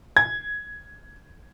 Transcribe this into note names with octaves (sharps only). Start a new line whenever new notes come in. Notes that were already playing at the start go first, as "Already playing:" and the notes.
G#6